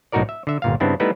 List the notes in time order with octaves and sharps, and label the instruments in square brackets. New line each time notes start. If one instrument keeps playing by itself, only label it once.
[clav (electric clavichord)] B1 A2 D#4 F#4 A#4 D5
E5
D3 E5
G1 A#2 F5
G2 C#3 B3 C4 D4 E4
G3 A3 B3 D#4 E4 B4